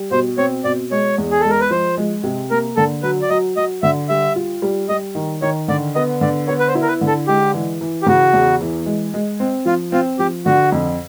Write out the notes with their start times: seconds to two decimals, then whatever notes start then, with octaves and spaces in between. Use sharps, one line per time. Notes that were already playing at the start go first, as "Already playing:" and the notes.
Already playing: G3
0.11 B2 C5
0.38 C4 C#5
0.64 B2 D5
0.91 G#3 C#5
1.18 E2
1.31 G#4
1.40 G#3 A4
1.50 A#4
1.61 B4
1.71 F3 C5
1.97 G#3
2.24 C3
2.50 A#3 A#4
2.76 D3 A4
3.03 F#3 B4
3.22 D5
3.30 F#3 D#5
3.57 F#3 D#5
3.83 D3 E5
4.09 G3 E5
4.36 F4
4.62 G3
4.89 G3 D#5
5.15 D#3
5.42 D#3 C#5
5.68 D3 D5
5.95 B3 D#5
6.21 D3 D5
6.47 B3 C#5
6.59 B4
6.68 C5
6.75 E4
6.82 A#4
6.88 B4
7.01 D3
7.07 A4
7.27 G#3 G4
7.54 E3
7.81 E3
8.02 G4
8.06 C#3 F#4
8.33 E2
8.61 E3
8.86 G#3
9.14 G#3
9.40 C4
9.66 F3 F4
9.92 C4 F4
10.19 F3 G4
10.46 D3 F#4
10.72 F2